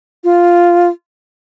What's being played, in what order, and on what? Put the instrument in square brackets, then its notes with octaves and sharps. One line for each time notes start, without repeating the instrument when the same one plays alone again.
[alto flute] F4